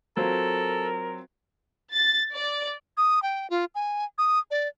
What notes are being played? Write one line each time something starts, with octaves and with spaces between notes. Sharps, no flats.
F#3 C4 F4 A4 A#4
A6
D5
D#6
G5
F4
G#5
D#6
D5